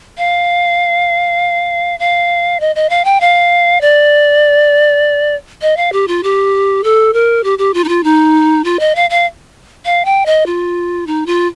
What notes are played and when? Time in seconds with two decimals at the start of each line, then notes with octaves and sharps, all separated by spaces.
0.18 F5
2.00 F5
2.60 D#5
2.76 D#5
2.90 F5
3.05 G5
3.21 F5
3.81 D5
5.62 D#5
5.77 F5
5.93 G4
6.08 F4
6.23 G4
6.84 A4
7.13 A#4
7.44 G4
7.59 G4
7.74 F4
7.84 D#4
7.89 F4
8.04 D#4
8.64 F4
8.80 D#5
8.95 F5
9.10 F5
9.85 F5
10.05 G5
10.26 D#5
10.46 F4
11.07 D#4
11.26 F4